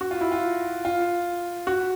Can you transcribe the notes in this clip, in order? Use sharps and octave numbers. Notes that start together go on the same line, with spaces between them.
F#4
F4
E4
F4
F4
F#4